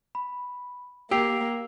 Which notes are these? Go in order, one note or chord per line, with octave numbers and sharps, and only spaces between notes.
B5
A#3 G4 E6 C7 F7